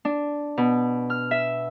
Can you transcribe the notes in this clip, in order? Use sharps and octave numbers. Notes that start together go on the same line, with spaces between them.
D4
B2
F6
E5